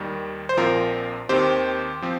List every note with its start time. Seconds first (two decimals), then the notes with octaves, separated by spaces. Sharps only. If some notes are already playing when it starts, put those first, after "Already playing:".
Already playing: D#2 D#3 G3
0.49 C5
0.57 A#1 A#2 F3 C4 F4 A#4
1.29 D#2 D#3 C4 G4 C5
2.02 F3 C4